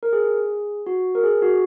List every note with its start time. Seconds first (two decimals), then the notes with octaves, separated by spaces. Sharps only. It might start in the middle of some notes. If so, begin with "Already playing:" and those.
0.03 A#4
0.13 G#4
0.86 F#4
1.15 A#4
1.23 G#4
1.42 F#4